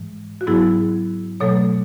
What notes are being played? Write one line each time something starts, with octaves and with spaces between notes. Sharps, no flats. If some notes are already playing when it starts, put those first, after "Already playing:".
Already playing: G#2 E3 G#3
F#4
G#2 F#3 B3 E4 G#4
B2 F#3 A3 A4 C#5